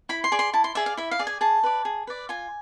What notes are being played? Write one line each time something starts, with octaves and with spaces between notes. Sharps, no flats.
E4 B5
C6
G#4 D5
C6
E4 A5
C6
G#4 D5 E5
F5
E4 E5
F5
G#4 D5
G#5
G#4 A5
B4 D5
G#4
B4 D5
F4 G#5